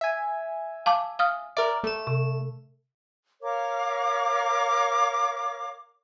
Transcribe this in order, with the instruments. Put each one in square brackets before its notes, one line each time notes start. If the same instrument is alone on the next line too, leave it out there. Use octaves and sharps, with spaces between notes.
[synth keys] E5 G#5
[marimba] F5 A5 D6
F5 D#6 F6
[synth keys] A#4 D5 [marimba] E5
[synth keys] A3 E7
[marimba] C3
[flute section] A#4 C#5 F5 D6